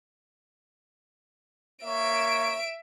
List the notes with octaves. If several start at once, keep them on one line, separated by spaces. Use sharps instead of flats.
A#3 C#5 E5 D7